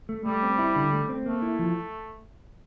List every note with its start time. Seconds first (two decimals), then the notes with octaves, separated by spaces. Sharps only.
0.09 A3
0.25 G3 A3
0.43 C4
0.59 E4
0.76 D3
0.93 A3
1.09 C4
1.26 A3 A#3
1.42 E4
1.59 F3